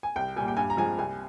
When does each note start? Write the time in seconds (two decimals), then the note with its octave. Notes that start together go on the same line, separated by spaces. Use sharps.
0.03 G#5
0.16 C2 G5
0.36 A#2 G3 G#5
0.48 G5
0.57 G2 G#5
0.70 A#5
0.77 F3 G#3 G#5
0.98 C2 G#5